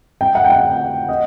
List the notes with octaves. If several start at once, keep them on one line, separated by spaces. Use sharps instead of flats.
G5
F#5
G5
F#5
D#5